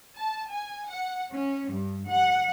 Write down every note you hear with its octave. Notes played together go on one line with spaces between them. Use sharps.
A5
G#5
F#5
C#4
G2
F#5